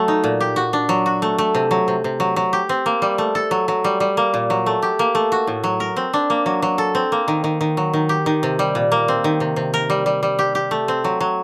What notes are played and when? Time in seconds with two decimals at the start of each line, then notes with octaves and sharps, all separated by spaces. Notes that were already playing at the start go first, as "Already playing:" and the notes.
Already playing: F#3 A3
0.08 D#4
0.24 A#2
0.40 G4
0.56 F#4
0.73 D4
0.89 F#3
1.06 F#4
1.22 A3
1.38 A3
1.55 C3
1.71 F#3
1.88 C3
2.04 C3
2.20 F#3
2.36 F#3
2.53 G4
2.69 C4
2.86 A#3
3.02 G3
3.18 A3
3.35 A4
3.51 F#3
3.68 F#3
3.84 G3
4.00 G3
4.17 A#3
4.34 A#2
4.50 F#3
4.66 A3
4.82 G4
4.99 A#3
5.15 A3
5.32 F#4
5.47 A2
5.64 F#3
5.80 A#4
5.96 C4
6.13 D4
6.30 A#3
6.46 F#3
6.62 F#3
6.78 A4
6.95 C4
7.12 A#3
7.28 D#3
7.44 D#3
7.61 D#3
7.77 F#3
7.93 D#3
8.09 G4
8.26 D#3
8.43 C3
8.59 G3
8.75 A#2
8.92 A#3
9.08 C4
9.24 D#3
9.40 C3
9.56 C3
9.74 A#4
9.90 G3
10.06 G3
10.23 G3
10.39 G4
10.55 G4
10.71 A3
10.88 C4
11.04 F#3
11.20 F#3